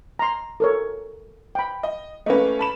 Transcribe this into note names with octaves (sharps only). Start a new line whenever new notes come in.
A#5 C6
A4 A#4 C#5
G5 B5
D#5
A3 A#3 C#4 B4 D#5
A5 B5 E7